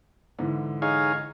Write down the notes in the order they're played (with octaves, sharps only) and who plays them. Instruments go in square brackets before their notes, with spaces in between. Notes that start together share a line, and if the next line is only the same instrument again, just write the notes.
[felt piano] G#2 D3 E3
[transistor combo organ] D#4 G#4 C#5 [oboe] F5